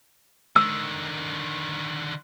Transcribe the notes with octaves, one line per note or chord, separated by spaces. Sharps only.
D3 D#3 E6